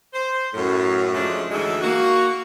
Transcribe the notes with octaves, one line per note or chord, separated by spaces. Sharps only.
C5
F#2 A2
C#3 F3 G#3 A3 C#4 D4
D2 G#2 E3 G#3 A4 E5
A#3 F#4